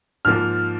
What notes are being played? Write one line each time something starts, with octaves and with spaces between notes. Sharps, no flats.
G#2 F3 A#3 F6